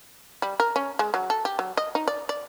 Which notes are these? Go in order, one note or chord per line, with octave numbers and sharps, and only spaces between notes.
G3
A#4
C#4
G#3
F#3
A4
G4
F#3
D#5
D#4
D5
D5